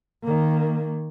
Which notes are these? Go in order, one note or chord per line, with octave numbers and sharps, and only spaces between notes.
D#3 A#3